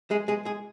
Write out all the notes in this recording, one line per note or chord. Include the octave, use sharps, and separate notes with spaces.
G#3 G#4
G#3 G#4
G#3 G#4